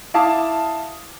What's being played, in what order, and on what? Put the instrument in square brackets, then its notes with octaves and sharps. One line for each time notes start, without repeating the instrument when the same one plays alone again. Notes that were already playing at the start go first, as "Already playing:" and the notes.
[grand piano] E4 F5 A5 D6 D#6